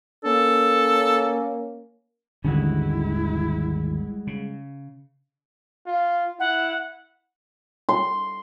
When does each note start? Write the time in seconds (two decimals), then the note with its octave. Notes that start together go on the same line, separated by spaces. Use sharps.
0.25 A#3 C#4 A4
2.44 G#1 D#2 D3 G3 G#3 C#4 E4 F#4
4.27 C#3
5.86 F4
6.40 E4 F#5
7.89 C6